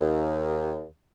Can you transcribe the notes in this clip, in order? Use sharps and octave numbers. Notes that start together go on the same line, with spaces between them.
D#2